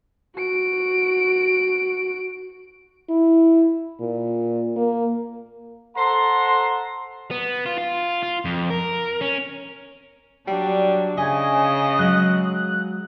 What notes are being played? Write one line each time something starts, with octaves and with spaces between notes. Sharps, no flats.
F#4 D7
E4
A#2
A#3
A4 C5 F#5 A#5 C6
B3
F4
F4
F4
F2
A#4
C#4
F#3 G3 D4
C#3 D#5 E5 G#5
F#3 G#3 F#6